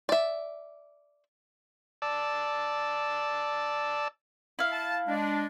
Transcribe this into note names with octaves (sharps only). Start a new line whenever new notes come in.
D5 E5
D5 A5 E6
E4 F5
A5
G#3 D4